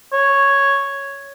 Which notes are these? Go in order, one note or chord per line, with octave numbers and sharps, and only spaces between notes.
C#5